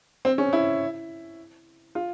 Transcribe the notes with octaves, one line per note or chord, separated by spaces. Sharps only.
C4
C#4
E4
F4